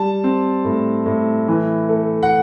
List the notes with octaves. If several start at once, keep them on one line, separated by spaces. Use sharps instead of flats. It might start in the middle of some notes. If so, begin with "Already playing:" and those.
Already playing: G3 A5
C4
A2
A2
E3
A3
F#5